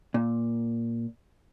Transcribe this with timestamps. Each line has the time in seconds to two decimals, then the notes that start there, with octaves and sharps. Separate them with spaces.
0.14 A#2